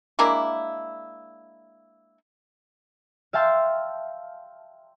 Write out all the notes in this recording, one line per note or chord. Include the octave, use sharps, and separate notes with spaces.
G#3 A#3 D4 E4
E5 F5 G5 A5 C6 E6